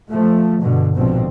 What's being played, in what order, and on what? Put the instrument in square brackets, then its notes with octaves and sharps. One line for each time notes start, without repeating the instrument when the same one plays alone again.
[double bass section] F3 A3
G2 B2 D3
A#1 G#2 B2 D3 F3 C4